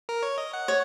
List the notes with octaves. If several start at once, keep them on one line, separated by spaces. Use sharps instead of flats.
A#4
C#5
D#5
F#5
C#5